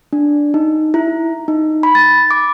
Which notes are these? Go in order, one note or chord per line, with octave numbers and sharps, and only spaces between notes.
D4
D#4
E4
D#4
B5
A6
D6